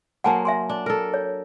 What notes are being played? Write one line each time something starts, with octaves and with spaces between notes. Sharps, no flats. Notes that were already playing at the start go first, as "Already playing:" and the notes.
F#3 A#3 C5 F#5 G#5 A5
E5 G#5 C6
D4
A4 A#4
C#5